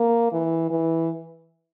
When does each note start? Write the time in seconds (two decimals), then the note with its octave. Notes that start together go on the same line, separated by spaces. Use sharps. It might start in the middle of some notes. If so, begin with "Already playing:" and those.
Already playing: A#3
0.32 E3
0.70 E3